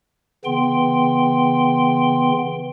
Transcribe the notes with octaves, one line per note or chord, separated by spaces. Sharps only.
C#3 E3 B3 G5 C6